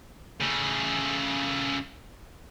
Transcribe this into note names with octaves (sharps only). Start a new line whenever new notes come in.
C#3 A3